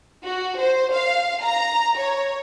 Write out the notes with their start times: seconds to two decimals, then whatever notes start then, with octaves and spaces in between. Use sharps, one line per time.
0.24 F#4
0.60 C5
0.94 F5
1.43 A#5
1.99 C#5